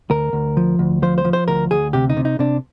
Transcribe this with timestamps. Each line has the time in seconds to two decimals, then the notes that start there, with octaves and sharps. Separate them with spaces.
0.10 D2 A#4
0.33 D2
0.57 F3
0.79 D2
1.03 F3 C5
1.18 C5
1.25 F3
1.33 C5
1.48 D2 A#4
1.71 D2 G#4
1.93 C3 G4
2.10 D#4
2.17 C3
2.25 D#4
2.39 C3 D4